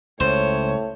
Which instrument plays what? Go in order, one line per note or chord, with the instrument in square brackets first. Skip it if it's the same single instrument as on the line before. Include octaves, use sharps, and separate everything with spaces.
[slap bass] C#2 [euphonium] A2 [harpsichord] C5 [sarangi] C#5